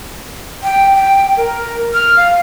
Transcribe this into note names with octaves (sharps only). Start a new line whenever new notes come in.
G5
G5
A#4
F6
F5